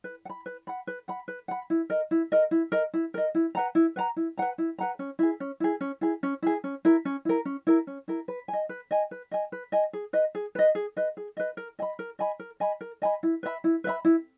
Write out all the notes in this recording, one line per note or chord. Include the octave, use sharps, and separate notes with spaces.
B4
F#5
B5
B4
F#5 B5
B4
F#5 B5
B4
F#5 B5
E4
A#4 D#5
E4
A#4 D#5
E4
A#4 D#5
E4
A#4 D#5
E4
B4 F#5 A#5
E4
B4 F#5 A#5
E4
B4 F#5 A#5
E4
B4 F#5 A#5
C#4
E4 G#4
C#4
E4 G#4
C#4
E4 G#4
C#4
E4 G#4
C#4
E4 A#4
C#4
E4 A#4
C#4
E4 A#4
C#4
E4 A#4
B4
G#5
D#5
B4
D#5 G#5
B4
D#5 G#5
B4
D#5 G#5
G#4
B4 D#5
G#4
B4 D#5
G#4
B4 D#5
G#4
B4 D#5
A#4
D#5 G#5 B5
A#4
D#5 G#5 B5
A#4
D#5 G#5 B5
A#4
D#5 G#5 B5
E4
B4 E5 B5
E4
B4 E5 B5
E4